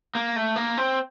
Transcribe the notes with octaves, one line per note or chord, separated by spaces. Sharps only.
A#3
A3
A#3
C4